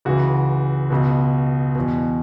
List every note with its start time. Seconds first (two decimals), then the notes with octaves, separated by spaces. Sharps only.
0.05 C#2 C#3 E3 F#4
0.90 C#2 B2
1.75 E2 B2